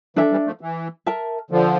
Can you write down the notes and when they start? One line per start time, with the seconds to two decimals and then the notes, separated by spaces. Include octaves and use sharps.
0.16 E3 D4 A4 E5
0.31 E3 G3
0.46 F3 A3
0.61 E3
1.06 A#4 E5 A5
1.51 D3 F3